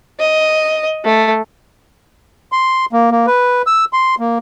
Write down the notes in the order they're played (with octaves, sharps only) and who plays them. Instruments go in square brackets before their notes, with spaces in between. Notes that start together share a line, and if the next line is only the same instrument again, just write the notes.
[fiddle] D#5
A3
[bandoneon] C6
A#3
A#3
B4
E6
C6
A#3